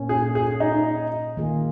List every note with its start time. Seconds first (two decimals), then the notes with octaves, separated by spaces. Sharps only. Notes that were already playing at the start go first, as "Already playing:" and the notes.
Already playing: A#2 A#3 C#4
0.09 G#4
0.35 G#4
0.60 D#4
1.37 D#3 A#3 F4 G#4